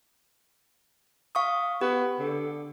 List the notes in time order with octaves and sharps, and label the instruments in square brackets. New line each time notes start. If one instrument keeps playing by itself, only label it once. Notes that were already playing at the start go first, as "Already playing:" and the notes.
[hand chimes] F5 C#6 D#6
[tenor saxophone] B3 [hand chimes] G4
[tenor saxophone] D3